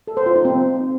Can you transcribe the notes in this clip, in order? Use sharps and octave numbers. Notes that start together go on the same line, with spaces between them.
A4
C5
F4
D#4
C4